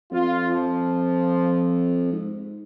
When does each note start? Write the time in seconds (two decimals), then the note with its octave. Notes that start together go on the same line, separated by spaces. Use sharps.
0.12 F2 F4
0.48 F3
2.12 G#2